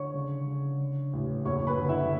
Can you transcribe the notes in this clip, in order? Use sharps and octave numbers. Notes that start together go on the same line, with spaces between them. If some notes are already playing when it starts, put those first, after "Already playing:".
Already playing: D3 C#5 C#6
C#3
C#3
D3
A1
F#1 C#5 C#6
B4 B5
D3
E4 E5